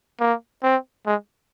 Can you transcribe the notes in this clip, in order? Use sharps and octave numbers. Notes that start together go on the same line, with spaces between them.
A#3
C4
G#3